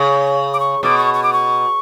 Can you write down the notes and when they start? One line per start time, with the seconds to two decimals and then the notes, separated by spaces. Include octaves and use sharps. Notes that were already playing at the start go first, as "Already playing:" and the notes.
Already playing: C#3 C#5
0.54 D6
0.60 C#6
0.83 B2 D6
0.98 C#6
1.14 C#6
1.23 D6
1.33 C#6